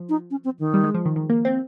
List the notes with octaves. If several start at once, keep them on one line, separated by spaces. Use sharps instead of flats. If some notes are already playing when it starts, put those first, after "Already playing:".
Already playing: F3
D#4
C#4
C4
D#3
G3
G#3
F3
D#3
D#3
A#3
C4